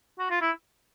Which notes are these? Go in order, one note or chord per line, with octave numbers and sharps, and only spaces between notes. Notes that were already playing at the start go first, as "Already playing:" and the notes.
F#4
F4
E4